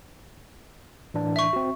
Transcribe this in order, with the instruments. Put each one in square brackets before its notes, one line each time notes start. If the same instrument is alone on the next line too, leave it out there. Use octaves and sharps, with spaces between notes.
[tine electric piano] A2 E3 D4
[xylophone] E5 C#6
[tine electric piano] C4 F#4